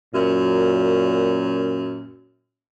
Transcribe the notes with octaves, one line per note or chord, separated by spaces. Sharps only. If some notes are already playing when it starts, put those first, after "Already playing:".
F#2 A#2